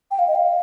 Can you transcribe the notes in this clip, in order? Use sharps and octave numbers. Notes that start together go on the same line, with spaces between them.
G5
F5
D#5
F5